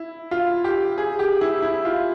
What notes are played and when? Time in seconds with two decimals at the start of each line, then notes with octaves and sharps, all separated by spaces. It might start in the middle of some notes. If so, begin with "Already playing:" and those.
Already playing: E4
0.31 F4
0.64 G4
0.98 G#4
1.19 G4
1.41 E4
1.62 E4
1.85 F4